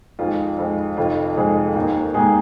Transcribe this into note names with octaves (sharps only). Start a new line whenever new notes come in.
F2 D#3 G#3 F4
F2 D#3 G#3
F1 F2 D#3 F4
F1 F2 D#3 G#3 G#4
D#2 D#3 A#3
D#2 D#3 G#3 A#3 G#4